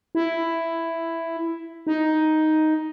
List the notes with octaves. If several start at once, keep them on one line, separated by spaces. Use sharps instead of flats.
E4
D#4